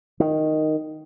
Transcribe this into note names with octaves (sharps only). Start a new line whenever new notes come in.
D#3